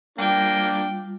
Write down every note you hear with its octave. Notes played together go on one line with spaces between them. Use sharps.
G3 A#3 D4 F4 G5